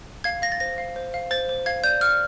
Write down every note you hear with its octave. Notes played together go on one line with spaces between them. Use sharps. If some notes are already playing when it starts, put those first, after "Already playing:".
F5 G#6
F5 A#6
A6
C5 A#6
F5
C5
F5
C5 A6
C5
F5 G#6
D5 G6
D5 F6